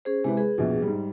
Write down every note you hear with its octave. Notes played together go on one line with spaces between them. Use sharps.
C#4 G#4 C5
C3 G#3 E4 B4
G#4 B4
A#1 F2 B2
G#2 G3